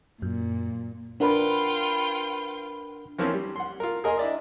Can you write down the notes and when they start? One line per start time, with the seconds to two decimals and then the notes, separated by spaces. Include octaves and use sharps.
0.22 F#2 A#2
1.20 D4 F4 A#4 B4 F#5 G5
3.19 E3 F3 A#3 C4 C#4
3.34 G3
3.56 F#5 C6
3.80 F4 A#4
4.04 G#4 A#4 D#5 G#5 C6
4.18 D4 E4 D5 D#5